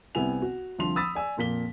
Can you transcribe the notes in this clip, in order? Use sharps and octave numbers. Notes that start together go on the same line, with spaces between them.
C2 C3 B3 E4 G#5 F7
F#4
C2 D3 F3 C6 F7
B5 D#6 E6 A6 B6
D5 G#5 E6
F2 A#2 A#3 B6 G7